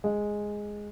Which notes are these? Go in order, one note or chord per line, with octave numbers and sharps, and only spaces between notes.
G#3